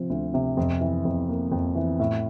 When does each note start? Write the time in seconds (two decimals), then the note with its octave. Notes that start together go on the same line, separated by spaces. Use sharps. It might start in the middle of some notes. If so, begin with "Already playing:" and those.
Already playing: C3 F3 C4
0.10 D2
0.34 C3
0.57 F2
0.81 E3
1.05 F2
1.29 A#3
1.52 F2
1.75 E3
2.00 A2